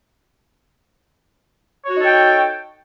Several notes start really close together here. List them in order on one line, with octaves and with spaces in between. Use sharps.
C#5 F#4 D#4 A4 G5